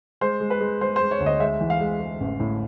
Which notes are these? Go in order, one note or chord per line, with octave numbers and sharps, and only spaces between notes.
G#3 C5
G#3
B4
G#3
G#3 C5
G#3 C5
C#5
D2
D#5
G#3 E5
E3
F5
G#3
G#3
A1
A2